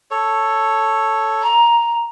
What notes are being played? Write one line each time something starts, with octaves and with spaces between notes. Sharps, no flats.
A4 C#5
A#5